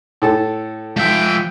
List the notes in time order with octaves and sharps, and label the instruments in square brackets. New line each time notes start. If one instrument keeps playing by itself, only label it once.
[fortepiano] A2 A4 A5
[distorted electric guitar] F3 E5 [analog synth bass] G#3 [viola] G5